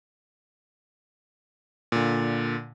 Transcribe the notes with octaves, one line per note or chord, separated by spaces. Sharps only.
A#2 D3